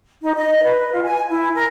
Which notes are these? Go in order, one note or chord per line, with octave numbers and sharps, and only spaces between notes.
D#4
D#5
B4
F4
G#5
E4
A#4